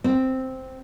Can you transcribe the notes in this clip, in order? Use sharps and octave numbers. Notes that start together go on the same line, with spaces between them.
C4